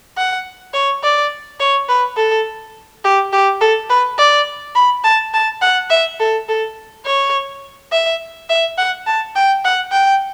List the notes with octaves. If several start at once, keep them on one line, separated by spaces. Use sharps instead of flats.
F#5
C#5
D5
C#5
B4
A4
G4
G4
A4
B4
D5
B5
A5
A5
F#5
E5
A4
A4
C#5
E5
E5
F#5
A5
G5
F#5
G5